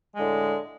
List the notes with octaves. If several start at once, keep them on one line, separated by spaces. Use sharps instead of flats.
A2 D3 G#3